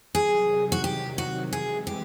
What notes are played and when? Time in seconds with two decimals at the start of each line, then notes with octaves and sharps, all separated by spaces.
0.15 C3 D#3 F#3 G#4
0.72 F#4
0.84 G4
1.18 F#4
1.52 C3 E3 G#3 G#4
1.87 G4